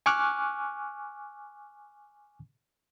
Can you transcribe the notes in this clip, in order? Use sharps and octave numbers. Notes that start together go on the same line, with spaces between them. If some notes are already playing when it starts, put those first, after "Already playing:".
G#5 C#6 D6 F6 F#6